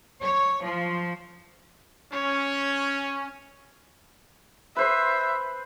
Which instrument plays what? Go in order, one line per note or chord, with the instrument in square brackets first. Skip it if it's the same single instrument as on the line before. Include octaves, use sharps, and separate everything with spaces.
[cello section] C#5
F3
[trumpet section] C#4 [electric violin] C#5
[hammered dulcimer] B4 C5 C6 [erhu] E5